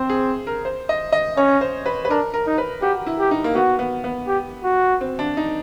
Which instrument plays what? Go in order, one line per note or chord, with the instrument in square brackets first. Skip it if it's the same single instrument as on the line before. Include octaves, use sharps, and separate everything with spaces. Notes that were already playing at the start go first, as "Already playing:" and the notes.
Already playing: [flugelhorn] C4 [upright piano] C5
[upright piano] G#4
A#4
C5
D#5
D#5
[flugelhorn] C#4 [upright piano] C#5
[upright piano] C5
B4
B4
[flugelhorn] D4 [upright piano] A#4
[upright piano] A#4
[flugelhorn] D#4
[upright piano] B4
[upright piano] F#4 [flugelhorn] G4
[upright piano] E4
[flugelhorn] G4
[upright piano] D#4
A#3
[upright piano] B3 [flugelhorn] F#4
[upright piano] B3
B3
[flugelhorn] G4
F#4
[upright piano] C4
D4
D#4